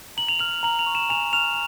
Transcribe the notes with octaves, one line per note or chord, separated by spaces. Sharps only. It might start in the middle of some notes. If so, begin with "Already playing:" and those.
A#5 F#7
F7
F6 F#7
A#5 F#7
F7
C#6
E7
G#5 F7
F6 F7